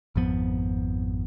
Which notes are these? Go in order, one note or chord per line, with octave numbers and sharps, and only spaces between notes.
G#1 F2 F3 B3